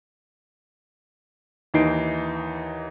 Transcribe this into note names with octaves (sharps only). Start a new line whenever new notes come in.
D#2 E3 D#4 C7 D7